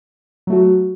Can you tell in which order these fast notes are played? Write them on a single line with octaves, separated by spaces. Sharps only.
F#3 A3 F#4